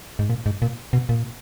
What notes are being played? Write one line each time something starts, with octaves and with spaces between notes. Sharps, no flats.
G#2
A#2
G#2
A#2
B2
A#2